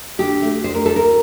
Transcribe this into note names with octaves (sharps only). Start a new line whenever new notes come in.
D3 G4
A3
D2 C5
A#4
D2 A4
A#4